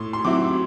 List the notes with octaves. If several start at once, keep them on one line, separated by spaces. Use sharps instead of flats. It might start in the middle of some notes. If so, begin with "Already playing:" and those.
Already playing: A2 C6
C6
F#3 C4 E4 D6